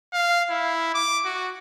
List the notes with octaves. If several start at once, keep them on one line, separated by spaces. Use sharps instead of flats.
F5
E4
D6
F#4